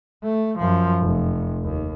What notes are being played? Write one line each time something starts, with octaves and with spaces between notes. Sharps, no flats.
A3
F#2 F3
F1
D#2